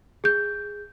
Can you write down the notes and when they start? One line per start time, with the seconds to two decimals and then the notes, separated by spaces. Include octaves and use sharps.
0.24 G#4 G6